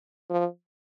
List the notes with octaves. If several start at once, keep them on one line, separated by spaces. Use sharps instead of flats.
F3